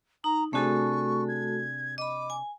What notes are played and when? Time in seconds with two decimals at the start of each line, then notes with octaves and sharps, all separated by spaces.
0.24 D#4 A#5
0.53 C3 A3 D4 F#4 G#4 A4 C#6
1.28 G#6
1.98 D#5 B5 D6
2.30 G#5